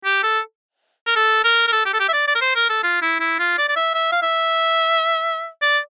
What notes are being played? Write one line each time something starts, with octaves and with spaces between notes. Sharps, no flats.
G4
A4
A#4
A4
A#4
A#4
A4
G4
A4
G4
E5
D5
D5
A#4
C5
A#4
A4
F4
E4
E4
F4
D5
D5
E5
E5
F5
E5
D5